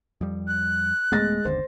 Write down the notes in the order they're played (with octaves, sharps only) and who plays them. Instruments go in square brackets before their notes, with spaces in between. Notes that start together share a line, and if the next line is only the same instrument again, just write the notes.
[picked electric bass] F2 G3
[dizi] F#6
[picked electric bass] D#1 A3 B3 [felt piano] G#3 A6 A#6
[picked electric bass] G1 D#2 D3 [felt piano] C5